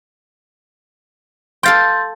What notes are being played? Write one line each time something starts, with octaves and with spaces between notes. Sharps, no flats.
A4 F5 G5 C6 G6 A6